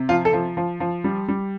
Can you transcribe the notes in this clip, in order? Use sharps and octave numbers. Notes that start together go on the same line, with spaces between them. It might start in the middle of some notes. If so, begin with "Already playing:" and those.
Already playing: C3
F3 F4
A4
F3
F3
F3
G3
G3